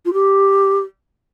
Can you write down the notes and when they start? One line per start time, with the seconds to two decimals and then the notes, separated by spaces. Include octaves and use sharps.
0.05 F4
0.13 G4